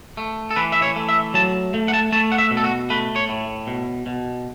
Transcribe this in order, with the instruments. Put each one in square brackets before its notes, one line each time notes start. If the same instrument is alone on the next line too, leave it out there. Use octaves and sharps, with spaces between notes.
[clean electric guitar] A3
A4
E3 B4
E5
C#5
A3
E5
F#3 A5
A3
F#5
A5
A3 A5
F#5
E5
B2
A4
F#4
A3 B4
C#5
A2
B2
B2